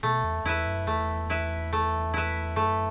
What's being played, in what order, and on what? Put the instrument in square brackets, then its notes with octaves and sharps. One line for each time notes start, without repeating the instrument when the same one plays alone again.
[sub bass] B2 [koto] A3
[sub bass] E2
[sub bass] E2 [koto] E4 B4 E5
[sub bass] F#2
[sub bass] E2 [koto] A3
[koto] E4 B4 E5
A3
E4 B4 E5
[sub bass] F#2 [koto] A3